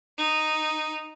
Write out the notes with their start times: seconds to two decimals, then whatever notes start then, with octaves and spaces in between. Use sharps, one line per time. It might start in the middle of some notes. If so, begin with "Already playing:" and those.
0.18 D#4